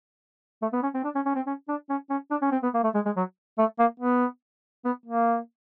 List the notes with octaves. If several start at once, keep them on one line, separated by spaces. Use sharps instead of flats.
A3
B3
C#4
C4
D4
C#4
C#4
C4
C#4
D4
C#4
C#4
D4
C#4
C4
B3
A#3
A3
G#3
G#3
F#3
A3
A#3
B3
B3
A#3